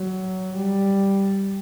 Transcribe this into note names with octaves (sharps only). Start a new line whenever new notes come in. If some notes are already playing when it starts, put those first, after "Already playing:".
Already playing: F#3
G3